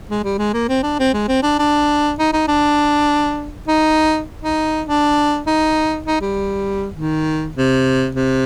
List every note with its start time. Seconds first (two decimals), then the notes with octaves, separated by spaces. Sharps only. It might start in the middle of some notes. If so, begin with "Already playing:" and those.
0.10 G#3
0.24 G3
0.39 G#3
0.54 A#3
0.69 C4
0.83 D4
0.99 C4
1.14 G#3
1.28 C4
1.43 D4
1.59 D4
2.19 D#4
2.33 D#4
2.48 D4
3.68 D#4
4.42 D#4
4.87 D4
5.46 D#4
6.06 D#4
6.21 G3
6.96 D#3
7.56 C3
8.15 C3